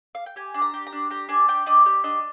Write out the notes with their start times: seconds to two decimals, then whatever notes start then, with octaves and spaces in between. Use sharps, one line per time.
0.15 F5
0.26 G5
0.36 G4 G#5
0.54 D4
0.62 A#5
0.74 G4
0.87 A#5
0.92 D4
1.10 G4 A#5
1.29 D4 G#5
1.48 G4 G5
1.66 D4 D#5
1.86 G4
2.04 D4 D#5